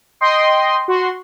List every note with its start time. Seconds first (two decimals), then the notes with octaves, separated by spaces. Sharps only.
0.21 D#5 G5 C6
0.88 F#4 C6